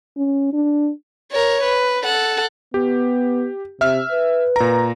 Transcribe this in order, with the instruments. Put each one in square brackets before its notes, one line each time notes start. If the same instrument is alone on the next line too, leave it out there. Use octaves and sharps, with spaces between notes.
[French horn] C#4
D4
[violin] A#4 C#5
B4
A4 F#5
[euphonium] B3 [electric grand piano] G4
[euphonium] C3 [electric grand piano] E5 F6
[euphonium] B4
[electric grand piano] A#2 A#5